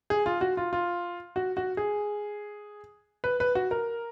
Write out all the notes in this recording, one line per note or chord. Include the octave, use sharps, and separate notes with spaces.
G#4
F4
F#4
F4
F4
F#4
F#4
G#4
B4
B4
F#4
A#4